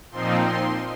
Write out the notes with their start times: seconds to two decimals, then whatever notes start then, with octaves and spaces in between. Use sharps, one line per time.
0.11 A#2 F3 C4 D#4 C6
0.45 C6